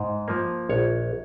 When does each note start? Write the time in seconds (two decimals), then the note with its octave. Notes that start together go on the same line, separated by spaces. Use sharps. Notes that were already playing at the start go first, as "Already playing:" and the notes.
Already playing: G#2
0.28 F3 A#3
0.69 A#1 C#5